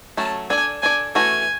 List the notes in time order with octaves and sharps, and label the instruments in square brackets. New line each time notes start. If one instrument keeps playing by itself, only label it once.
[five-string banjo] F#3 A3 C#4 [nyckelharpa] A5
[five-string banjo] D4 A4 D5 [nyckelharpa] G#5
[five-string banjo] D4 A4 D5 [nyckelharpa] G#5
[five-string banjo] E3 A3 C#4 F#4 [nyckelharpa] G#5